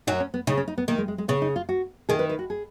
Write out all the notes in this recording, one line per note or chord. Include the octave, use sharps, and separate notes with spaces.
F#2 F#3 D#4
C#4
B3
C#3 D#4
C#4
D#4
B3
D#3 A#3
G#3
G#3
G#3
C#3 B3
D#4
F4
F#4
D#3 G#4
B4
B4
F#4
G#4